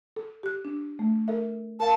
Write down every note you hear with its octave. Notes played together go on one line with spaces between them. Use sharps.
A4
G4 F#6
D4
A3
A4 A#4 E5
A#4 F5 A5